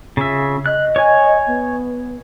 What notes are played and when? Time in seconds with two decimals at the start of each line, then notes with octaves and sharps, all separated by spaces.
0.17 C#3 F4 E5
0.66 D#5 F#6
0.96 C#5 G#5
1.47 B3